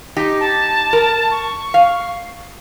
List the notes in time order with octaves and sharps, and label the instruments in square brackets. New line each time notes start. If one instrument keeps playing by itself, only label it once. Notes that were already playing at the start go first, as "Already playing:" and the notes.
[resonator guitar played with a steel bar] D#4 G4
[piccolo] A5
[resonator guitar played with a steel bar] A#4
[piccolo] C#6
[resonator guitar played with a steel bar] F5